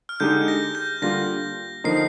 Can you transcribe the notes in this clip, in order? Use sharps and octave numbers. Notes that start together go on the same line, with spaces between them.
F6
D3 G#3 D#4 G4 G6
A#6
G6
D3 G3 A#3 F4 A#6
D3 F3 A#3 D#4 A#4 C7